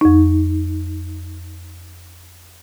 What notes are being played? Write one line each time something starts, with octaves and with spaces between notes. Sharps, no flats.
F2 D#4